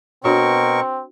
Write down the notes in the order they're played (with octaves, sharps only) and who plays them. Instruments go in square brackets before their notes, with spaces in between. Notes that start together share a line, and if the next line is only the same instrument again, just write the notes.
[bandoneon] B2 A#4 C#6 [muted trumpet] C4 [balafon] D4 F#4 C#5